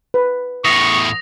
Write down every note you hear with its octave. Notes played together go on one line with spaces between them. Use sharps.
B4
E2 A2 C#6 D#6 A#6 F7